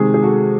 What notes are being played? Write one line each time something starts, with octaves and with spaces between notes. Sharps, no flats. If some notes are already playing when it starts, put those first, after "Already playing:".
Already playing: C3 D#3 G#3 G#4
G#4
F#4 A4